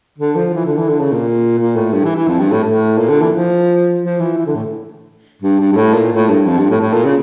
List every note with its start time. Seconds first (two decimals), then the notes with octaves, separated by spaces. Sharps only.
0.18 D3
0.36 F3
0.54 E3
0.65 D3
0.77 E3
0.88 D3
1.00 C#3
1.12 A#2
1.59 A#2
1.76 A2
1.93 G2
2.04 E3
2.16 E3
2.27 F2
2.39 G2
2.51 A2
2.63 A2
2.98 A#2
3.09 D3
3.21 E3
3.32 F3
4.02 F3
4.20 E3
4.38 E3
4.46 D3
4.55 A2
5.42 G2
5.60 G2
5.72 G2
5.76 A2
5.94 A#2
6.12 A2
6.29 G2
6.46 F2
6.58 G2
6.70 A2
6.81 A2
6.93 A#2
7.05 C#3